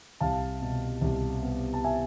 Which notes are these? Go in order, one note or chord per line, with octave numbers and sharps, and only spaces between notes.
C2 F5 A5
B2
C2
B3
A5
E5 G#5